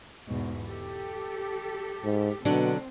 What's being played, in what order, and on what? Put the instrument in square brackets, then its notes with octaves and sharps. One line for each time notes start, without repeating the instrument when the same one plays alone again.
[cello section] E2 G#2 B2
G4 A4
[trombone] G#2
[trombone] B2 [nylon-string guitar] D3 F#3 D4 [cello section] C4